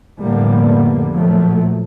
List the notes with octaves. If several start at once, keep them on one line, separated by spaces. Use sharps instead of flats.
F2 A2 D3 G3 A#3 B3
A#2 F3 F#3 A3